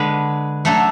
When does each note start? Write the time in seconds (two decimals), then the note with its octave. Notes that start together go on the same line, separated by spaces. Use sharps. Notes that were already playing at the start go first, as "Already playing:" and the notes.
Already playing: D3 G#3 B4
0.65 D3 F#3 A3 A4